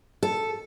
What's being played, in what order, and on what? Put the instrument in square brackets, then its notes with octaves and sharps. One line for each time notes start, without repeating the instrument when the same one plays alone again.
[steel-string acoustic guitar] A4